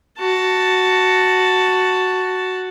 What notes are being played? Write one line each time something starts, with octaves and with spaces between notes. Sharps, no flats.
F#4 A5